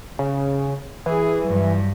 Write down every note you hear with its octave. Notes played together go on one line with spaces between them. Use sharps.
C#3
E3 G#4
G2 F#3